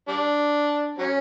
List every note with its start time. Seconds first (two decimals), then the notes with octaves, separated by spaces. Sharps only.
0.08 G3 D4
0.98 F#3 C#4